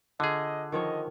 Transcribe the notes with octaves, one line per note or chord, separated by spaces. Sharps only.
D3 F4 G#4 D#5
D#3 F3 C#5 D#5